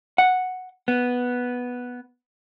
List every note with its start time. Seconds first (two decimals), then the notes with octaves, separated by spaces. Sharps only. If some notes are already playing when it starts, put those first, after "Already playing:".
0.18 F#5
0.88 B3